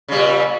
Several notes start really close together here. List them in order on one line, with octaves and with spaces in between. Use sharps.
C#3 G3 A#2